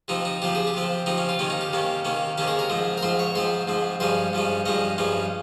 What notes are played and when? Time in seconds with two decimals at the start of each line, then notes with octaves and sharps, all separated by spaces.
0.08 C3 F3 C4 D#4
0.25 D#4
0.42 C3 F3 C4 G4
0.55 G#4
0.67 G4
0.74 C3 F3 C4
1.06 C3 F3 C4 D#4
1.17 C#4
1.29 F4
1.39 C3 D#3 A#3 C#4
1.50 D#4
1.61 G4
1.73 C3 D#3 A#3 C#4
2.05 C3 D#3 A#3 C#4
2.38 C3 D#3 A#3 C#4 G4
2.48 G#4
2.59 A#4
2.70 G#2 F3 C4
2.98 A#4
3.03 G#2 F3 C4 C5
3.19 C#5
3.35 G#2 F3 C4 C5
3.68 G#2 F3 C4
4.00 G2 F3 G#3 C#4 C5
4.33 G2 F3 G#3 C#4
4.66 G2 F3 G#3 C#4 D#5
4.98 G2 F3 G#3 C#4